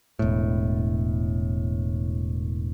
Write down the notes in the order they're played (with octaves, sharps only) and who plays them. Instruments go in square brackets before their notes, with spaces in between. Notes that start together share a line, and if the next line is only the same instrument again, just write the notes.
[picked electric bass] E1 A2